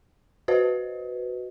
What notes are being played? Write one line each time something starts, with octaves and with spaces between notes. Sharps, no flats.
F#4 B4 C5 D#5